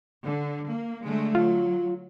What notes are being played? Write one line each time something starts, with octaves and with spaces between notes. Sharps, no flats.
D3
A#3
D3 G#3 A3
F#3 F4